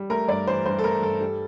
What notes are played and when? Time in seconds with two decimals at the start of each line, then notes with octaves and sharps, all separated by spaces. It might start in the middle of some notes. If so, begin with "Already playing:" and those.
Already playing: G3
0.10 A3 A#4
0.28 G2 D5
0.47 E3 C5
0.65 G2 C5
0.79 A4
0.84 A3 A#4
1.02 G2 A4
1.21 G3